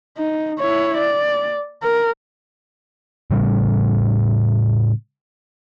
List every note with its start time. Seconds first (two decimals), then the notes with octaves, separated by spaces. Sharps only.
0.18 D#4
0.59 E4 C#5
0.98 D5
1.83 A#4
3.31 A2 C#3 G3 C#4